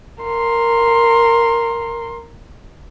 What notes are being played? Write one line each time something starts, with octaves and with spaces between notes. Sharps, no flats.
A#4 C6